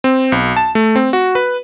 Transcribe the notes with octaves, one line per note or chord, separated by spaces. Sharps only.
C4
B1
A5
A3
C4
F#4
B4